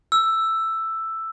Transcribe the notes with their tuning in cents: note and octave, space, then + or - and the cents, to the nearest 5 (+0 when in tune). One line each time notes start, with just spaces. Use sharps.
E6 +5